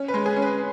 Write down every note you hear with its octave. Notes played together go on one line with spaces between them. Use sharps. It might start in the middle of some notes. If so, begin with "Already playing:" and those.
Already playing: C#4
B4
G#3
G#4
C#4
B4